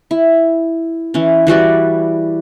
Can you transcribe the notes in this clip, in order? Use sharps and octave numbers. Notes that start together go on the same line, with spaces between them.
E4
E3 C#4
E3 G3 F#4 D5